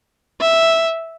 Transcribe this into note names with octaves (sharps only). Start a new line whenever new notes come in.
E5